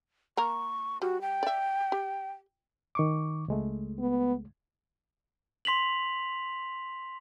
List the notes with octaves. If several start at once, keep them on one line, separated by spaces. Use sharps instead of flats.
A#3 A#4 A#5 C#6
G3 F#4
G5
D5 E5
G4
D#3 C#6 D6
C#2 G#3 A3
B3
C6 B6 F7 F#7